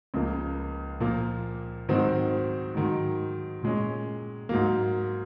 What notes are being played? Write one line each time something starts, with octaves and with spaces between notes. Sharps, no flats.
C#2 C#3 F3 A#3
A#2 F3 A#3
G#2 D#3 F#3 C4 F#4
G#2 D#3 F#3
A#2 G#3 C#4
G#2 F#3 A#3